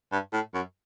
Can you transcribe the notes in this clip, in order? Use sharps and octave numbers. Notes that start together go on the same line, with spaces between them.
G2
A2
F#2